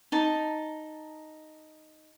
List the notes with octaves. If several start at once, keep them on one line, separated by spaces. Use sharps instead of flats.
D#4 A5